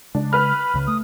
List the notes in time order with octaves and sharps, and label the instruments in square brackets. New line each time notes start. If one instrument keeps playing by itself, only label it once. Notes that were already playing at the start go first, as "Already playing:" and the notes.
[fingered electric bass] C#3 G#3 [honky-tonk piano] D4
[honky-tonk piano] B4 F6 [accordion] B5
[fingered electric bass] C#2 C#3
[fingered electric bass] A3 [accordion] D#6